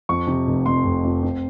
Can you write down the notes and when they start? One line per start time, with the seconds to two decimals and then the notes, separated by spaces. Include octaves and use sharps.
0.09 F2 C#6
0.27 C3
0.47 F1
0.66 F2 C6
0.85 F1
1.04 F2
1.23 C4